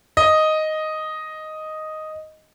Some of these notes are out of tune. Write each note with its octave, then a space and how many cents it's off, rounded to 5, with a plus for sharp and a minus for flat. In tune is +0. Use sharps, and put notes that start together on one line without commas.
D#5 +0